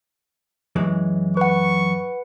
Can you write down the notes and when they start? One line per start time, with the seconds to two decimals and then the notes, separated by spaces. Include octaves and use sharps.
0.76 F#2 E3 G#3
1.37 B4 F#5 C#6